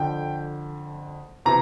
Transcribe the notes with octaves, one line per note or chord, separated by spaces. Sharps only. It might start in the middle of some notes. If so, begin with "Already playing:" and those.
Already playing: F2 D3 G5
C3 E3 A#5